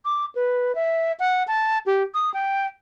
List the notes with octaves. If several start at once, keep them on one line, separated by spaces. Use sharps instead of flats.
D6
B4
E5
F#5
A5
G4
D#6
G5